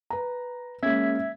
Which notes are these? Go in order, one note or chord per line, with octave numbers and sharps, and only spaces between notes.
B4 A#5
G#3 A#3 C#4 E5 G#6 B6